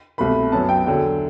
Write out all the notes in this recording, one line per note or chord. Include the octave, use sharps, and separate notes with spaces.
C2 B2 A3 B5
F#2 F#3 B3 A5
G5
E2 D3 F#3 G5